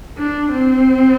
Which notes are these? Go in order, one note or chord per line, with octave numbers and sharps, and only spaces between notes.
D4
C4